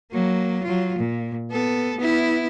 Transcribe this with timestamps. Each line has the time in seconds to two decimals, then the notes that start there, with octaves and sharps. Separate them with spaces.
0.12 F#3 A#3
0.64 F#3 F4
0.98 A#2
1.51 B3 A4
1.98 B3 E4